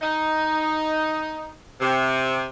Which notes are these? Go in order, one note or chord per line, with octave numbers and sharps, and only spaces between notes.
D#4
C3